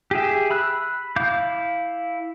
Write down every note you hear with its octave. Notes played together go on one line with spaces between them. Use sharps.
G4 G#4 E5
B5 E6 F#6
E4 F5 D6 G6